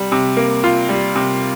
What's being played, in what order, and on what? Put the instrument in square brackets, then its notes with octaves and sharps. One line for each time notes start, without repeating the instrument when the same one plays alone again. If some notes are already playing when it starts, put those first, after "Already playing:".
Already playing: [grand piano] C3 G3
C3
A#3
F4
G3
C3